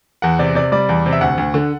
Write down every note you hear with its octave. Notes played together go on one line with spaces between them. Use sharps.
E2 F#5
C3 D5
C3 D5
G3 D5
E2
C3
E5
D2 F#5
D2
D3